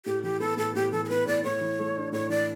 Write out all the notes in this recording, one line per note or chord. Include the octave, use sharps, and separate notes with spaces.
A2 G4
E3 G4
B3 A4
A2 A4
A2 G4
E3 A4
A4
B3 B4
A2 D5
A2 C#5
E3
A3
D4
A2 C#5
E3 D5